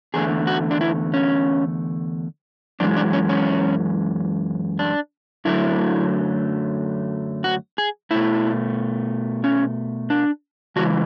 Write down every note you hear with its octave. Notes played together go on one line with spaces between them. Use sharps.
E2 D3 A3 G#4
F#4
D4
E4
C#4
F#2 E3 G#3 D4
D4
C#4
C#4
D4
F#2 D3 F#3 A3 E4
F#4
G#4
B2 A3 E4
C#4
D4
C#3 E3 G#3 F#4